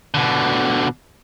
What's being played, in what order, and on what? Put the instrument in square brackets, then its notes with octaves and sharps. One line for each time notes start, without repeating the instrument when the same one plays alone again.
[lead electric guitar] B2 D3